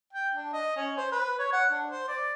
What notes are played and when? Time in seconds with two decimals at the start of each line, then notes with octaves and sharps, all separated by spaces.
0.13 G5
0.35 D4
0.53 D#5
0.77 C#4
0.98 C5
1.12 B4
1.39 C#5
1.53 F#5
1.72 D4
1.90 C5
2.08 D5